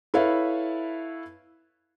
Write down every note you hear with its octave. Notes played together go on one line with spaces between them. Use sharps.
E4 A4 B4 C#5 E5 F5